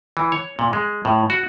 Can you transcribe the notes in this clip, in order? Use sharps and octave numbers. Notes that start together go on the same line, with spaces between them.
E3
C#5
A#2
G#3
A2
F#4